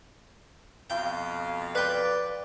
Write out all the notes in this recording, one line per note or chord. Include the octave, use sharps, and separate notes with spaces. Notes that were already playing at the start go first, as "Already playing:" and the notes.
F2 B2 F5 G5
B4 D5 G5